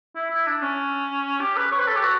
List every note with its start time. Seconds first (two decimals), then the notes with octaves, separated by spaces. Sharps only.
0.15 E4
0.30 E4
0.47 D4
0.62 C#4
1.40 G4
1.57 B4
1.71 C#5
1.79 B4
1.88 A4
1.96 G4
2.03 F#4